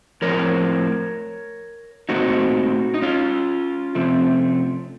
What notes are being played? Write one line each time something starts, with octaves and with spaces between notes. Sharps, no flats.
A2 F3 C4 A#4 C#5
A#2 A3 C4 D#4 F#4
D#4
C#4 F4
C3 F3 A3 C4